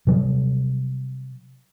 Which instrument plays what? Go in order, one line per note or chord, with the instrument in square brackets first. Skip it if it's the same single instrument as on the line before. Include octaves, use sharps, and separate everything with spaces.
[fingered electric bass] C3 F#3 G3